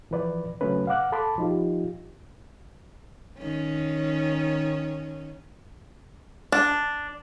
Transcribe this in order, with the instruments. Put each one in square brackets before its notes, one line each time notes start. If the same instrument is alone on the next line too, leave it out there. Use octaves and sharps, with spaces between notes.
[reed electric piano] E3 F3 B4 D5
C#3 F#3 A3 C#4 B4
F5 F#5 D6 F#6
A4 A5 B5 C6 D6
F3 D#4 F4 G4
[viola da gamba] D#3 C#4
[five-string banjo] D4